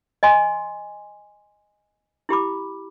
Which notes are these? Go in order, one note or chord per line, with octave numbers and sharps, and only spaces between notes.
D#5 G#5 C6
E4 G4 B5 D6